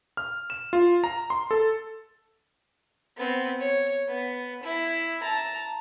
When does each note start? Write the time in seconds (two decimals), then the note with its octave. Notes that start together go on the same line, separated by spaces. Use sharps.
0.17 F6
0.50 E7
0.73 F4
1.04 A#5
1.30 C6
1.51 A4
3.17 B3 C4
3.60 C#5
4.07 B3
4.63 E4
5.21 A5 A#5